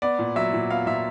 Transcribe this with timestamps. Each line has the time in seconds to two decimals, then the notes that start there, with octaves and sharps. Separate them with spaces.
0.02 B3 D5
0.19 A#2
0.36 F#3 E5
0.53 A#2
0.70 B3 F5
0.87 A#2 E5